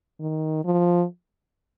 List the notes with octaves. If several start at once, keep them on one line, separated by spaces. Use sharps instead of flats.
D#3
F3